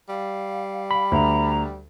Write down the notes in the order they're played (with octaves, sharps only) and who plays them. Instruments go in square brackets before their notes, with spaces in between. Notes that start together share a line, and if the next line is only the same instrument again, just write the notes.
[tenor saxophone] G3 [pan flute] F5
[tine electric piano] B5
[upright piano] D2 [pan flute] A#5